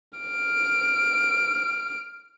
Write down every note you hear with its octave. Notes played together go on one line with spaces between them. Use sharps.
F6 D7